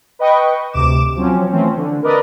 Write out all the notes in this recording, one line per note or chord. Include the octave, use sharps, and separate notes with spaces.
B4 D#5 G5 C#6
D2 C3 D6 E7
F3 F#3 C4 C#4
E3 F3 A3 C4 C#4
D3
A#4 B4 D5 D#5